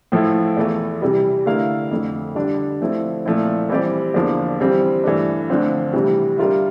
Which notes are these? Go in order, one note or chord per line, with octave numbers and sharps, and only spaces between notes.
A2 F3 A3 E4
E2 E3 A3
C3 E3 G3
D3 A3 E4 A#4 F5
F2 D3 F3 A3
D3 G3 D4
D3 F3 A3 C4 E4
A#2 F3 A3 C4 E4
E3 G3 C4 G4 D5
E2 D3 F3 A#3 D4
E3 G3 C4
G2 E3 A3 D4
D2 D3 F3 C4 F4
D2 C3 E3 G3
G3 D4 F4 A#4 E5